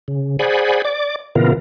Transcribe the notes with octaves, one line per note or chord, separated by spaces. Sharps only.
C#3
G#4 C5 D5 F#5 G#5 B5
D5 D6
A#2 C#3 E3 B3 F4 A#4